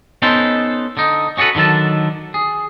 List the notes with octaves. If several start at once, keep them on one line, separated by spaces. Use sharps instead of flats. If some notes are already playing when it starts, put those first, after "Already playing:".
B3 C#4 D#4 A4 B4 C5
D3 D#4
C#4 F#4 G4 A4 B4
D3 D#3 F#3 A4 A5
G#4